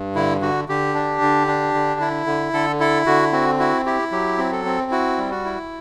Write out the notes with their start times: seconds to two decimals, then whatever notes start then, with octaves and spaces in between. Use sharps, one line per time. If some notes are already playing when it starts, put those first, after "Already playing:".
Already playing: G2
0.15 D3 E4
0.41 D3 F#4
0.69 D3 G4
0.94 D4
1.22 D3
1.47 D4
1.74 D3
2.00 E4
2.27 D3
2.53 D3 A4
2.80 E4 A4
3.06 D3 F#4
3.32 C4 F#4
3.59 E4 F#4
3.86 E4 G4
4.12 F#3 G4
4.38 C4
4.52 A4
4.65 C4
4.91 E4 F#4
5.18 G3
5.31 F#4
5.45 E4